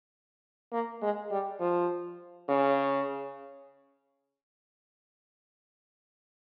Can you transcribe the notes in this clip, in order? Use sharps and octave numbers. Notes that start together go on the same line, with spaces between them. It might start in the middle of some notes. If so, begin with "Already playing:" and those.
A#3
G#3
G3
F3
C#3